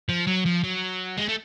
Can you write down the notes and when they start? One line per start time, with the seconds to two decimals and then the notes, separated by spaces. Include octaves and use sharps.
0.09 F3
0.27 F#3
0.45 F3
0.63 F#3
1.17 G#3
1.28 A3